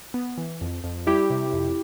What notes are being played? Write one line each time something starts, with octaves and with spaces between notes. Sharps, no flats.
B3
E3
F2
F2
G3 E4 G4
C3
F2